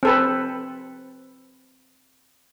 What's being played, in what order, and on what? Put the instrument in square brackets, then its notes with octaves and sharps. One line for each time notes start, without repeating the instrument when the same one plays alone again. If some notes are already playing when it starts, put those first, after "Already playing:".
[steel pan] C4 A4 B4